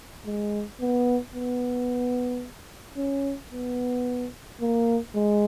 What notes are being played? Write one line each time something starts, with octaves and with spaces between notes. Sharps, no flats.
G#3
B3
B3
C#4
B3
A#3
G#3